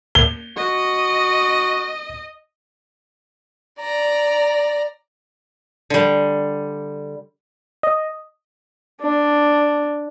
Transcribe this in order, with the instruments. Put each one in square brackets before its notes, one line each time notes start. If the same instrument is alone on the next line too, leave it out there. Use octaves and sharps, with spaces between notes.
[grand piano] G7
[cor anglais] F#4 [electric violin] D#5
[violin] D5 A#5
[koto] D3 G3
[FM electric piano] D#5
[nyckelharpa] D4